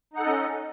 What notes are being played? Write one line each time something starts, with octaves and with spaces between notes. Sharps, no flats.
C#4 D#4 A4 D#5 F#5